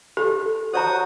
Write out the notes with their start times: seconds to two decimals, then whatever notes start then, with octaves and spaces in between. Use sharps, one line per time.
0.17 G4 A4
0.74 F#4 C5 C#5 A#5 D#6